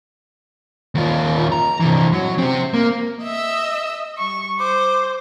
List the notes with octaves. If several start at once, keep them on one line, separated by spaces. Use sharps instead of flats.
D#2 F4
A#5
C3 E3
F#3
C4 G4
A#3
D#5 E5 E6
G3 C#6
C5 D6